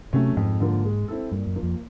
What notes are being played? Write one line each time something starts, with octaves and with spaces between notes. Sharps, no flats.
C3 F#3 A3 C#4
F2 G#2
D3 F3 A#3
G#3
C4 E4 A4
G2 A#2
F#2
F3 A#3
F2